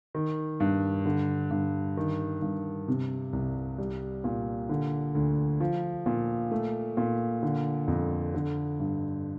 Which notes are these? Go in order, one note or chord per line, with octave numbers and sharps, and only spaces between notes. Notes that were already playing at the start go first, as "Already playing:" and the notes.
D#3
G2
D3
G2
D#3
G2
C3
C2
G3
A#2
D3
D2
F3
A#2
A3
A#2
D3
F2
D3
G2